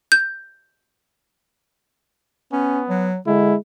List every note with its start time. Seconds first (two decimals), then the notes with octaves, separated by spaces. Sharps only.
0.12 G6
2.52 B3 C#4
2.90 F#3
3.27 D3 G#3 E4